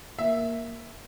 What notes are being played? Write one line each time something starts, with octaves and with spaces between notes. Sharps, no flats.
A#3 E5